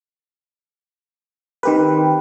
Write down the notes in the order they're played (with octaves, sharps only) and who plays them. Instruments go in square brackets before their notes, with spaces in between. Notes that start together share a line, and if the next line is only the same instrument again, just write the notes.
[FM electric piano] D#3 G4 B4 [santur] C4 A#4